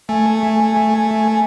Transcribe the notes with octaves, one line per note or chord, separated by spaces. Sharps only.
A3 G#5